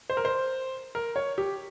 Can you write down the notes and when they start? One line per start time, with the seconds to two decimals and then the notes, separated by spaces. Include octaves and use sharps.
0.10 C5
0.17 A#4
0.25 C5
0.95 A#4
1.16 C#5
1.38 G4